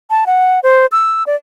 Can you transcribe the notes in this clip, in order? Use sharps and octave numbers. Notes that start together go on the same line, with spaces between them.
A5
F#5
C5
E6
D5